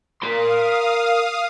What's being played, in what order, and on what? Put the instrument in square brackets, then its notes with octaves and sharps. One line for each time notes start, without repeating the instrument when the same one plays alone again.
[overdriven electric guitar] A#4 C6 [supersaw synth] F5 D#6